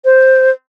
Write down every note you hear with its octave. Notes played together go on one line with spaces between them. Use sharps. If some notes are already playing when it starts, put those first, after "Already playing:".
C5